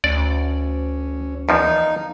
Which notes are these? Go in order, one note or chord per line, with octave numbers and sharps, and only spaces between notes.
D2 C#4 D5
E2 F3 A#3 D#4 F5